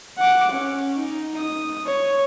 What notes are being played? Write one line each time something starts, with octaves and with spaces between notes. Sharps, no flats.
F#5 D6
C#4
D#4
D#6
C#5